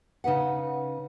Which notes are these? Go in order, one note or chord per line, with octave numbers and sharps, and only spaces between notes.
C#3 D#4 B4 F#5